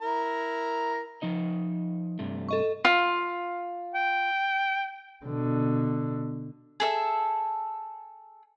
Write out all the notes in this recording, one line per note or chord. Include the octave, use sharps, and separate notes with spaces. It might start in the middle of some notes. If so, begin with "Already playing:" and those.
E4 A#4 A#5
F3 D#4 D#5
G2 C3 A3
A4 D#5 C#6
F4
G5
B2 D3
G#4 A4 E5